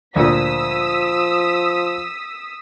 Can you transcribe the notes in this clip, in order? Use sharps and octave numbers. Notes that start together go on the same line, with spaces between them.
D2 A#2 F3 D#6 E6 B6